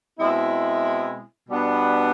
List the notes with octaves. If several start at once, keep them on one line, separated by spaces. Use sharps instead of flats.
B2 G#3 C4 E4
B2 G3 B3 D4